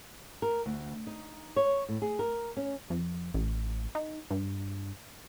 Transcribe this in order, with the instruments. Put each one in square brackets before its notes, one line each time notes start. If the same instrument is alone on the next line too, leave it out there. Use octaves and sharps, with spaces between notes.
[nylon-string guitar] A#4
D2
D#4
C#5
A2
G#4
A#4
C#4
[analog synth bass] F2
A1
D#4
G2